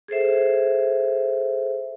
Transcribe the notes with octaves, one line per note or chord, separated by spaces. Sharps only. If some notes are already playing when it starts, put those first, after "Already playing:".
G#4 A4 C5 E5